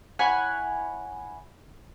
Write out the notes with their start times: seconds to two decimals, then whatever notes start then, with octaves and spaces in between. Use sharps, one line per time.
0.19 E4 C#5 F#5 G#5